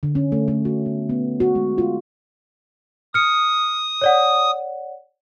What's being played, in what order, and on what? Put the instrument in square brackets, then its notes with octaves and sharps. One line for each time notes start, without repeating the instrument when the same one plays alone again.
[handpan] D3
C#4
A3
A3
F#4
B3
B3
F#4
G#3
F4
[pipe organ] D#6 [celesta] F6 C#7
[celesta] C#5 D5 F#5